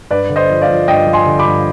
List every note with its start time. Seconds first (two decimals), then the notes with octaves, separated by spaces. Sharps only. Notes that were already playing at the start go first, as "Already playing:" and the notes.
0.11 G2 B4 D5
0.29 D3
0.36 C5 D#5
0.50 F3
0.62 D5 F5
0.68 F3
0.88 G2 D#5 G5
1.07 F3
1.13 G#5 C6
1.26 D3
1.39 B5 D6
1.45 G2